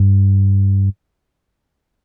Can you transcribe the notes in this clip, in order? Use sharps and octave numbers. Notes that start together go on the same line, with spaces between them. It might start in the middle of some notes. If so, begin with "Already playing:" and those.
Already playing: G2